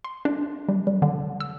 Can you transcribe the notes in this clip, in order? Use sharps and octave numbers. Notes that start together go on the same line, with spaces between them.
C6
D4
G3
G3
D3
E6